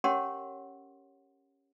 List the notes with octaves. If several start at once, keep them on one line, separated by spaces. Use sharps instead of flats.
C#4 G4 A#4 C#5 F#5 C6